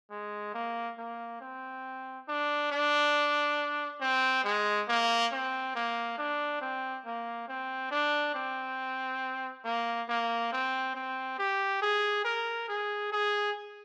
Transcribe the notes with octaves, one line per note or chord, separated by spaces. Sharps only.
G#3
A#3
A#3
C4
D4
D4
C4
G#3
A#3
C4
A#3
D4
C4
A#3
C4
D4
C4
A#3
A#3
C4
C4
G4
G#4
A#4
G#4
G#4